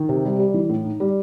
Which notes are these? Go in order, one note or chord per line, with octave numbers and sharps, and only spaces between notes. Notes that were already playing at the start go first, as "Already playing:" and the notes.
Already playing: D#3
C3
G3
G3
E3
A2
D#4
G3